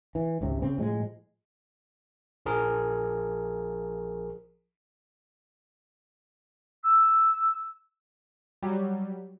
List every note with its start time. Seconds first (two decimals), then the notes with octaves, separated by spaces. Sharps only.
0.15 E3
0.41 G#1 C#2 C3
0.62 C#3 C4
0.78 A2 F3 G#3
2.46 A#1 F3 G#4 A#4
6.83 E6
8.62 F#3 G3